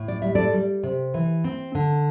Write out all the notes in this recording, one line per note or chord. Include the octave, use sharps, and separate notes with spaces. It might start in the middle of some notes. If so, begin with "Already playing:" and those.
Already playing: A2
D5
G3 E5
A4 D5
G3
C3
E3
C4
D3